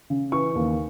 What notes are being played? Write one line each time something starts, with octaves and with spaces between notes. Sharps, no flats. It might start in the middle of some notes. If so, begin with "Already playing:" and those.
C#3
E3 C#6
D#2